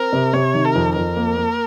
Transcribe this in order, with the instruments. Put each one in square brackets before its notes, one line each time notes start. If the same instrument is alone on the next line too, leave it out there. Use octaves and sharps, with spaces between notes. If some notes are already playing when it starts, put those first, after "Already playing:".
Already playing: [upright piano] C4 [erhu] A#4
[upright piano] C3
[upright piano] C3 [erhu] C#5
[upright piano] D#3
[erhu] A#4
[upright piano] F2
[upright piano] F2 [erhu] A#4
[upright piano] A#3
A#3